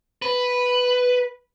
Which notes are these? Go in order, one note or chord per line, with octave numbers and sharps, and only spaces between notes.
B4